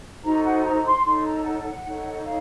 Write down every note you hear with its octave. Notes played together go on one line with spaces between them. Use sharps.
D#4 F#4 A4 C5 A#5
F#5
A#5
C6
D#4 A4 C#5 C6
A#5
F#5
D#4 A4 C#5
F5